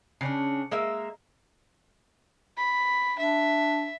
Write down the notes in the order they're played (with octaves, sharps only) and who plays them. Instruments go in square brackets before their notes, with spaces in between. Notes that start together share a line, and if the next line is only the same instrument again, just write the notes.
[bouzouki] C#3 C#4 D4
G#3 A#3 A#4 E5
[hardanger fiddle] B5
[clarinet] D4 [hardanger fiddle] E5